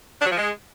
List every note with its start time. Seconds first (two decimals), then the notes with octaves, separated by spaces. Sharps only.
0.19 D4
0.25 F#3
0.31 F3
0.36 G#3